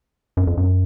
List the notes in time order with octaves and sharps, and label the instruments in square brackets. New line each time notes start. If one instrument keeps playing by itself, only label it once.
[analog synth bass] F#2
F2
F#2